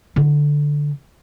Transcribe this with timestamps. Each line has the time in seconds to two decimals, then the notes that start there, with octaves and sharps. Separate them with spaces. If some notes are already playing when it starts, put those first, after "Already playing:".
0.16 D3 E4